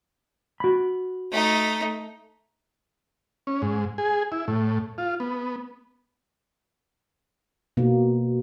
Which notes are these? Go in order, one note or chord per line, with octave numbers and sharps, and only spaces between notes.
F#4 B5
A3 D#4
C#4
G#2
G#4
E4
A2
F4
B3
B2 A#3